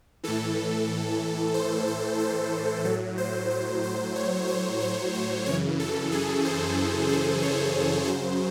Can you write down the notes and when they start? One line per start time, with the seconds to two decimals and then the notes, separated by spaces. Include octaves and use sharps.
0.24 A2 E3 A4
1.54 C5
1.87 A4
2.20 C5
2.85 A2 F#3 A4
3.18 C5
3.51 C5
3.84 C5
4.16 C#5
4.48 C5
4.81 C5
5.14 C5
5.46 F#2 C#3 E3 C#5
5.80 A4
6.12 G#4
6.45 C5
7.09 C5
7.43 C#5
8.08 F#2 C#3 F#3 C5